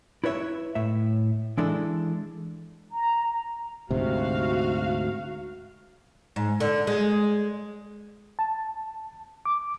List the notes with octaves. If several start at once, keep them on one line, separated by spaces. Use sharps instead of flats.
E4 B4 C#5 E5
A2 E5
E3 G#3 D4 E4 A4
A#5
D2 G#2 C3 F#4 F5
G#2
D3
G#3
A5
D6